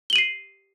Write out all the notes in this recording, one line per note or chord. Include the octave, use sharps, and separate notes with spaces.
C7 D#7 F#7 G7